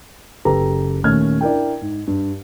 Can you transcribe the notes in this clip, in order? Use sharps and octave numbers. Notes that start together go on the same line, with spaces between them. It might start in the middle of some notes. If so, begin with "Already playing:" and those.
F#1 G4 A4 B4 A#5
D#2 A#2 A3 C#4 F6 G#6
D4 E4 A#4 G5
G#2
G2